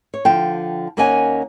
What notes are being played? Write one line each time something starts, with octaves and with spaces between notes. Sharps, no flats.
C#5
D3 F3 G5
D#2 A#3 C#4 D#5 F#5 G#5